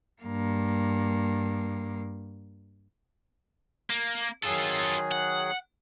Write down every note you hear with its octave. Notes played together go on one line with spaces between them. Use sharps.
G2 A#3
A#3
D#3 F#3 F4 G#4 A4
F#5